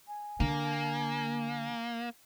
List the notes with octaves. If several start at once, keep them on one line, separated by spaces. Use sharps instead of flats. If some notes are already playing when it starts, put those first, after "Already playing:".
G#5
D3 A#3